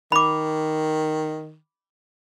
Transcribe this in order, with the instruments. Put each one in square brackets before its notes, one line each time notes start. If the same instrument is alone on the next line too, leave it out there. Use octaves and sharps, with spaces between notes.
[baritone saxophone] D#3 [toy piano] B5 D6